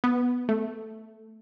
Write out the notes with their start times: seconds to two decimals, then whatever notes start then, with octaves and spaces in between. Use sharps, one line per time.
0.04 B3
0.49 A3